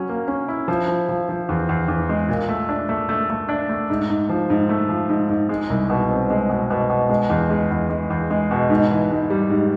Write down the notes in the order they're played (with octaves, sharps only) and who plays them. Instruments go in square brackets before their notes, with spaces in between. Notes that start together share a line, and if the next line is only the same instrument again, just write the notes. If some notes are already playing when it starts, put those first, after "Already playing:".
Already playing: [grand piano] F#3 C#4
A#3
C#4
E4
F3
F3
F3
F3
E2
E2
E2
G#3
A#2
A3
D4
A3
A3
A3
D4
A3
G#2
G#2
F3
G#2
A3
F3
G#2
G#2
G#3
C2
B2
C4
G#3
B2
B2
B2
G#3
E2
G#3
E2
G#3
E2
G#3
B2
G#2
E3
G#2
G3
G#2